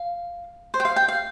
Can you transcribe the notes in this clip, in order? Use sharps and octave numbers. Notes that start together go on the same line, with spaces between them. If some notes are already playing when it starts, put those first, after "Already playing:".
Already playing: F5
C5
G5
F5
G5
F5